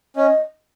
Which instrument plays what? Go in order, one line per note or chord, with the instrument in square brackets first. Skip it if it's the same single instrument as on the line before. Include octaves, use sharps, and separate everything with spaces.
[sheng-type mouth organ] C#4 [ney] D#5